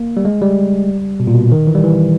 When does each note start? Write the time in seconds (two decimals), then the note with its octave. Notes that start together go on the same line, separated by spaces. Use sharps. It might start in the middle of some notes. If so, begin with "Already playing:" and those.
Already playing: A#3
0.17 G3
0.25 G#3
0.42 G3
1.20 B2
1.27 A#2
1.34 B2
1.52 D#3
1.67 E3
1.75 G3
1.84 E3